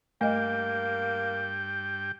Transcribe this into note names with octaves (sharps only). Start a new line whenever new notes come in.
G2 A3 A#3 D#5 G5